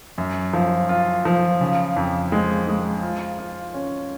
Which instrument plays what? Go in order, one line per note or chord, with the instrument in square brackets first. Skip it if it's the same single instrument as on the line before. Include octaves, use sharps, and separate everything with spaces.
[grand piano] F#2
F3
F4
F3
C#3
F2
G#3
G#3
F4
F4
C#4